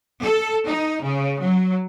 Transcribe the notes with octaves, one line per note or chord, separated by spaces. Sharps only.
A4
D#4
C#3
F#3